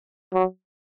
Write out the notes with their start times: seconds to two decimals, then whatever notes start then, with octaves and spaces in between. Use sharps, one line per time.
0.33 F#3